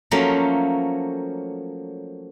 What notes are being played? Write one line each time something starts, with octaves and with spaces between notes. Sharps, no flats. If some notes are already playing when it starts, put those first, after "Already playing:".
F3 F#3 A3 A#3 C#4